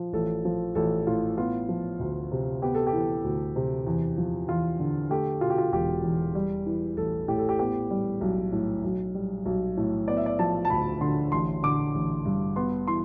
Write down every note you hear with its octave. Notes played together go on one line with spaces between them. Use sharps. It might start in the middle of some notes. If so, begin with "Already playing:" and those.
Already playing: F3
A1 A4
F3
A1 A4
A2 F4
B3 F4
F3
D2
C3
B3 G4
A4
G4
E3
D2
C3
E2
F3
E2 F4
D3
A3 G4
B2 F4
G4
F4
E1 G4
E2
G3
E3
A1 A4
A2 G4
A4
G4
B3 G4
G3
B1
A2
B1
G3
B1
A2
B3 D5
E5
D5
F3 A5
A5
D2 B5
D3 C6
A1 C6
D3 D6
A1
G2
B3 C6
E3 C6